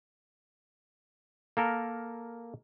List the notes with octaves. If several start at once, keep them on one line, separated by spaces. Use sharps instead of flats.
A#3 A4 A#4